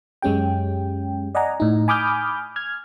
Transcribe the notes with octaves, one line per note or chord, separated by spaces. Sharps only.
F#2 G#3 C#4 G4 G5
D5 D#5 F#5 G#5 A#5
A2 D#4
G#5 B5 D6 D#6 F6 G6
F6 G#6